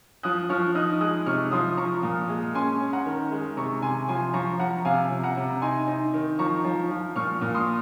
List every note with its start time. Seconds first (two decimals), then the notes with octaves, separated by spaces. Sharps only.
0.23 F3 D#6 F#6
0.49 F3 C#6 F6
0.75 D#4 D#6 F#6
1.01 G#3 D#6 F#6
1.26 C3 C#6 F6
1.52 F3 C6 D#6
1.77 F3 A#5 C#6
2.03 A#2
2.29 G#3
2.54 C#4 G#5 C6
2.80 C#4
2.93 F#5 A#5
3.05 D#3
3.31 G#3
3.57 C3 A#5 C#6
3.82 C3 G#5 C6
4.08 F3 G#5 C6
4.34 F3 A#5 C#6
4.59 F3 F#5 A#5
4.85 C3 F5 G#5
5.11 C3
5.23 F#5 A#5
5.37 C3
5.62 D#4 G#5 C6
5.87 D#4
6.14 D#3
6.39 F3 A#5 C#6
6.64 F3
6.91 F3
7.16 A#2 C#6 F6
7.41 A#2
7.55 C6 D#6